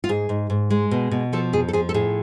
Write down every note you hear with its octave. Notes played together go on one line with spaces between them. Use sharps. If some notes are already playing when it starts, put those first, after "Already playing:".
F4
G#2 G#4
G#2
G#2
G#3
B2
B2
F3 A4
F2 G#4
A4
F3 G#4
A4
A2 G#4